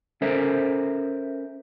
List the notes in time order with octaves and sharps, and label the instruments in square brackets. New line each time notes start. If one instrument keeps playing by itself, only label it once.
[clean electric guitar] C#4 A4 A#4 C5 E5